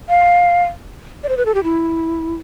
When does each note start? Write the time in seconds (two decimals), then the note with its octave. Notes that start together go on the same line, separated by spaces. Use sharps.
0.09 F5
1.23 D5
1.29 C5
1.37 B4
1.46 A4
1.54 G4
1.64 E4